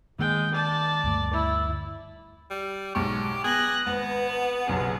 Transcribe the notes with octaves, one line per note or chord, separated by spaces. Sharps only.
D#3 G#3 A#3 G5
D5 A5
D2 G2 A3
E4
G3
B1 G#2 G4 C#6
B3 G#4 F#6 A#6 F#7
G#1 B3 B4
F#1 B1 C3 G#4